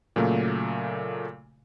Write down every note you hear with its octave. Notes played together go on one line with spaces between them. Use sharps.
A#2 C#3 F#3 A3 A#3